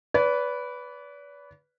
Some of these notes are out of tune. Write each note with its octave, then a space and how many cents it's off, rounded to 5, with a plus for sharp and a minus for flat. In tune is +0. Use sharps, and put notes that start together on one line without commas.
B4 +0 D5 -40